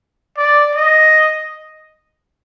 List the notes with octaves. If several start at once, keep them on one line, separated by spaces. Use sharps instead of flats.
D5
D#5